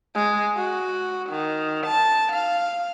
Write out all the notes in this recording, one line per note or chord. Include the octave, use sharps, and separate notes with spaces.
G#3
F#4
D#3
A5
F5